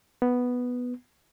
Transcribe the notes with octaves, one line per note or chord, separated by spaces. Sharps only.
B3